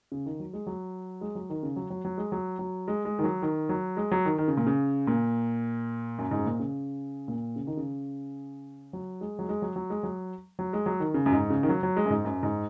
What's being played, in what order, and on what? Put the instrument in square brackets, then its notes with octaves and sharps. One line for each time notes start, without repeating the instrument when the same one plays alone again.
[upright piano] C#3
D#3
F#3
G#3
F#3
G#3
F#3
D#3
C#3
F#3
F#3
F#3
G#3
F#3
F#3
G#3
G#3
D#3
F#3
D#3
F#3
G#3
F#3
D#3
D#3
C#3
A#2
C#3
A#2
F#2
G#2
C#3
A#2
C#3
A#2
C#3
D#3
C#3
F#3
G#3
F#3
G#3
F#3
F#3
G#3
F#3
F#3
G#3
F#3
D#3
C#3
F#2
G#2
C#3
D#3
F#3
F#3
G#3
F#2
G#2
F#2
G#2